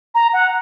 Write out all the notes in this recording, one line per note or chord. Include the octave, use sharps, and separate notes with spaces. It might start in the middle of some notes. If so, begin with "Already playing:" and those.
A#5
F#5